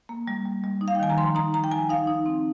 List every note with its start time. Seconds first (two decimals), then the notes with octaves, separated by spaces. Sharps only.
0.09 A#3
0.27 G3
0.45 G3
0.64 G3
0.81 D#4
0.88 F5
0.95 G5
1.00 D#3 G#5
1.10 A#5
1.18 F3 C6
1.35 D#4 A#5
1.53 F3 A#5
1.64 G5
1.71 F3 G#5
1.90 D#4 F5
2.07 D#4
2.26 C4